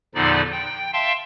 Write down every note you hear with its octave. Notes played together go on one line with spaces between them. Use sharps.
E2 A#2 D3 F3 D#4 D5
G5
E5 F5 G5 A5 C6